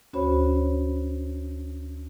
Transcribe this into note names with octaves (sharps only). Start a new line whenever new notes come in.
D2 C#4 F#4 C5 C#5 B5